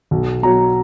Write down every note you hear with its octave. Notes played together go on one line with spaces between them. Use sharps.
B1
B2 F#3 A#5